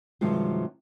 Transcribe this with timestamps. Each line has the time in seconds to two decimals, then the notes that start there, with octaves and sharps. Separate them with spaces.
0.21 G2 C3 D#3 F3 F#3 G#3